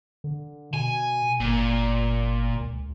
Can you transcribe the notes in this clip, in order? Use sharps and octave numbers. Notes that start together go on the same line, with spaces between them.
D3
B2 G#5
G1 A#2
C#2